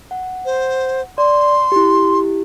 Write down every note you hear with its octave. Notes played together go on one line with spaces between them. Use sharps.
F#5
C5
D5 C6
E4 G4